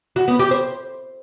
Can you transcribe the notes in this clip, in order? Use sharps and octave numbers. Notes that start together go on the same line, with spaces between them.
F#4
B3
G4
C5